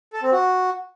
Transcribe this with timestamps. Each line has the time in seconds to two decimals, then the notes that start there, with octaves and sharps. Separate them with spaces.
0.13 A4
0.22 C4
0.32 F#4